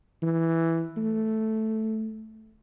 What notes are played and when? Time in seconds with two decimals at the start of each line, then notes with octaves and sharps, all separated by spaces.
0.23 E3
0.97 A3